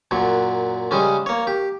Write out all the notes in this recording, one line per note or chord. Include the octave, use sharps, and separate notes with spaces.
F#2 A#2 F#3
C#3 G3 G#3 C#4
A#3 C#5
G4